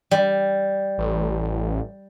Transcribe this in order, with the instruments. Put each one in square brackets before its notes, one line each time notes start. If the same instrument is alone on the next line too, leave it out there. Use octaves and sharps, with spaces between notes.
[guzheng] G3
[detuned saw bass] A1